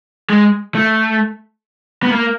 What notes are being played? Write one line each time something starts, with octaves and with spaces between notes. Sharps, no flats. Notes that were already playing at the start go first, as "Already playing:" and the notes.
G#3
A3
B3
A#3